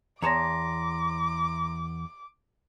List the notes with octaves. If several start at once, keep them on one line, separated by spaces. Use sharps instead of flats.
E2 C#5 A5 A#5 C6 D6 A#6